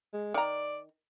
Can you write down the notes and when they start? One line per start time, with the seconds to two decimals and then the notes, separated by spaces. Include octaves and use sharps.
0.13 G#3
0.34 D#3 D5 A#5